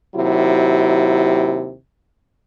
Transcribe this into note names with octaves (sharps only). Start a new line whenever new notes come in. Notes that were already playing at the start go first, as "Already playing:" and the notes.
D#2 C3 F#3 E4